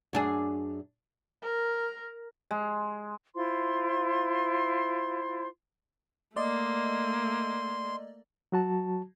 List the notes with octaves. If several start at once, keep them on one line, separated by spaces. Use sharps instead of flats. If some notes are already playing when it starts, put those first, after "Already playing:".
F#2 D4 G#4
A#4
G#3
E4 F4 C5 C6
A3 A#3 D5 D#5 C6
F#3 F#4 A5